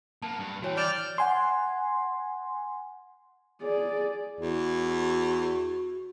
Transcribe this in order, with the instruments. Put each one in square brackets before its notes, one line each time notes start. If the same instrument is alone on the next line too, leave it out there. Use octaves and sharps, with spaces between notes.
[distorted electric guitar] A#3 B3 [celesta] A5
[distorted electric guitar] G2 B4
[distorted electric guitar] E3 [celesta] F#4 C#5 G5
[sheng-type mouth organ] D5 F6 G6 [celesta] A6 D7 E7
[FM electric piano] F#5 G#5 C6
[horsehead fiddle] G#4 D5
[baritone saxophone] E2 [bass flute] F#4